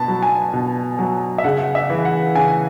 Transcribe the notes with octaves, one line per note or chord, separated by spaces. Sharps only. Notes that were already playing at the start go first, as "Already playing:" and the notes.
Already playing: B2 A5 B5
F#3
G#5
B2
F#3
E5
C#3 F#5
E5
E3
F#5
C#3 G#5